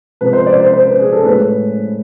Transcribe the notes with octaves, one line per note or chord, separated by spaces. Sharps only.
C3 F3 G#3 B4
C5
D5
C5
C5
B4
G#4
A4
A2 G#3 B4